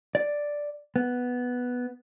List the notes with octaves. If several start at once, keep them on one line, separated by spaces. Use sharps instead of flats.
D5
B3